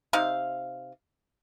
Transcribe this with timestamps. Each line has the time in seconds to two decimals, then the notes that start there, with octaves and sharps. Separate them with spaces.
0.13 C3 D#4 F5